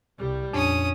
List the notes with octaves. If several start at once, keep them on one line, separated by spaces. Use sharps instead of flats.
C2 G3
A#1 F2 C#4 D4 D#6